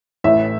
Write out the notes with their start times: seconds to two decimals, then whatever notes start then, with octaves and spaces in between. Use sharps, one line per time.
0.24 A1 A2 E3 E5